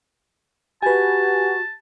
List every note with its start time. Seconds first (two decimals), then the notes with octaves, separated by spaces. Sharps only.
0.82 F#4 G4 B4 G#5 A5